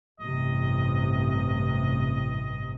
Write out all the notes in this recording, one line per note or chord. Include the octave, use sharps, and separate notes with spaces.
A1 G2 C3 D#5